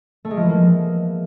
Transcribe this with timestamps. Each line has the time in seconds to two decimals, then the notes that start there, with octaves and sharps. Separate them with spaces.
0.25 A3
0.31 G#3
0.37 F3
0.43 E3
0.49 A#3